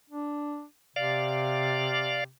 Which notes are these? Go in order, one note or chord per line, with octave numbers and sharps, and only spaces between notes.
D4
C3 D5 F5